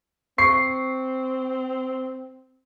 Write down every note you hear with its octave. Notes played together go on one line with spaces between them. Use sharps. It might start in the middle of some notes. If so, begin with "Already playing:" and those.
C4 C#6 C7